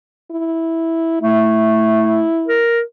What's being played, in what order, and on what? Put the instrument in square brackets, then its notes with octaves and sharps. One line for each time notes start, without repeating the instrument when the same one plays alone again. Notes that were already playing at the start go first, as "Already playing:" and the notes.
[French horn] E4
[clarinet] A3 [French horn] E4
[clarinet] A#4